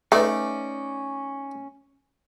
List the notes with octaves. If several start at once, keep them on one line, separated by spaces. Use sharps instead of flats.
A3 C#4 D#4 B4 D5 E5